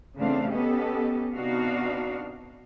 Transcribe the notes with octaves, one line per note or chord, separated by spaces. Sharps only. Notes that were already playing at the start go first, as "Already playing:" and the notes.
C#3 E3 A3 C4 D4 F5
B3 C#4 G4 A4 D#5
C3 B3 D4 D#4 F#4 F5